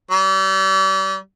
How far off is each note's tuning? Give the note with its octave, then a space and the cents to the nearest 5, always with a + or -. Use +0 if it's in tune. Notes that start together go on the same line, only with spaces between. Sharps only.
G3 -35